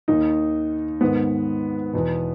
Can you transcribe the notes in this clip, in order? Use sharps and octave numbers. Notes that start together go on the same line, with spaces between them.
D#2 D#3 D#4
G#2 D#3 B3
E2 B2